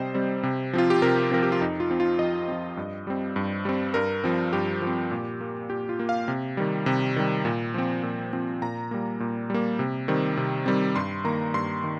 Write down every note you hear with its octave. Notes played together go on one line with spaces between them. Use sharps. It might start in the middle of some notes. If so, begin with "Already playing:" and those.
Already playing: C3 G3 C4 C5 D#5 G5
G3 C4
C3
F3 C4 F4
G4
C3 A#4
F3 C4 A#4
G4
F4
F2 D#4
F4
F3 C4
F4
F2 D#5
F3 C4
G2
G3 C4
G2
G3 C4
G2 A#4
F3 C4
G2 G4
F3 C4
A#2
A#3
A#2 G4
F4
A#3
F5
C3
D#3 G3
C3
D#3 G3
A#2
F3 C4
A#2
F3 C4
A#2 A#5
G3 A#3
A#2
G3 A#3
C3
D#3 G3 C4
C3
D#3 G3 C4
G2 C6
D#3 A#3 A#5
G2 C6
D#3